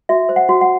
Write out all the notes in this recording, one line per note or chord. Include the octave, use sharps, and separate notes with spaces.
F#4 E5
C5
F#5
F#4
F#5